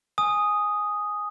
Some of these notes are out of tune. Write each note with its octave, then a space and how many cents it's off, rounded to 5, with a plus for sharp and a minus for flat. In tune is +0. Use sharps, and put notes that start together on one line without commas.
G#5 +0 D#6 +0